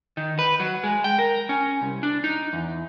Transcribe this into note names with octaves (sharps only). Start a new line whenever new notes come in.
D#3
B4
F#3
G#3
G5
A#4
C#4
C2
D4
D#4
E2